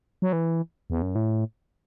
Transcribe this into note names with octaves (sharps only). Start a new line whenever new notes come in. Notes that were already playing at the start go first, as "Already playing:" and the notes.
F#3
E3
E2
F#2
A2